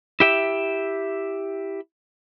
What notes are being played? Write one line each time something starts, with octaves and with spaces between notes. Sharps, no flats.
E4 G4 E5